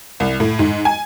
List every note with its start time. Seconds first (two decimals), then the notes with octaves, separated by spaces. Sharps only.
0.20 C2
0.40 A2
0.59 G#2
0.85 G#5